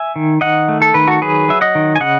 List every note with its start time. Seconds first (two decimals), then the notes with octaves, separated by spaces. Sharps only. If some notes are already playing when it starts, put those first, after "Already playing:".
Already playing: E5 G#5
0.16 D#3
0.41 D#3 D#5 F#5
0.68 A3
0.82 A4
0.94 D#3 B4
1.07 F#4 A4
1.21 F#3 G#4 B4
1.48 F#3 E5
1.61 D#5 F#5
1.75 D#3
1.96 G#5
2.00 C#3 D#5 F#5